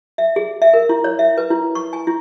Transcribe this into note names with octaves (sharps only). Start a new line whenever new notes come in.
E5
G#4
E5
A#4
E4
C#5
E5
B4
E4
C#6
G#5
E4